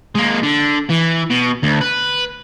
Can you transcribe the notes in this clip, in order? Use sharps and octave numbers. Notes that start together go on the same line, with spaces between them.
G#3 A#3
D3
E3
B2
D2
B4